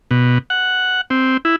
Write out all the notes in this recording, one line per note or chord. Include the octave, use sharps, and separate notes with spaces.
B2
F#5
C4
E4